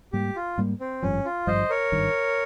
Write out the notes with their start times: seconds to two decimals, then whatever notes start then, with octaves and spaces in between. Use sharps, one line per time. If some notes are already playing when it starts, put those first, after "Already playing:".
0.13 G#2 G3 A#3 G4
0.36 F4
0.58 G#2 G3 A#3
0.80 C4
1.02 G#1 G2 F3 C#4
1.25 F4
1.47 G#1 G2 F3 C5 D#5
1.70 A#4 C#5
1.92 G#1 G2 D#3